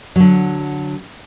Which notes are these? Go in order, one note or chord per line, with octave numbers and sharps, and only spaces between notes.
D3 F#3